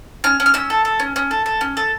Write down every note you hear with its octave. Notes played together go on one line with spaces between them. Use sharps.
C#4 F6
C#4
F6
C#4 E6
A4
A4
C#4
C#4
A4
A4
C#4
A4